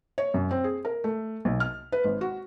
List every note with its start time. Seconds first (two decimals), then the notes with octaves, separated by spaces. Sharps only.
0.18 C#5
0.34 F#2
0.51 C4
0.64 G#4
0.85 A#4
1.04 A3
1.45 B1
1.60 F6
1.92 B4
2.04 G#1
2.21 F#4